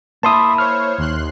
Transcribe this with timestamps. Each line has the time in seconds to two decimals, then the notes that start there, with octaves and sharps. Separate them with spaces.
0.23 A#3 E4 E5 A5 C6 D#6
0.58 C5 C#5 F6
0.98 D#2 C6 F#6